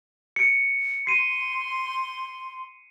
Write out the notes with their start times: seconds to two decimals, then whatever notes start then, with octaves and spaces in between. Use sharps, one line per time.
0.36 C#7 D7
1.07 C6 C7 D#7